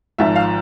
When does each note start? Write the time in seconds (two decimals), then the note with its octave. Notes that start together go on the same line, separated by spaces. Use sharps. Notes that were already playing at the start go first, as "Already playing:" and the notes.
0.18 G#1 G#2 F3 E5
0.36 F5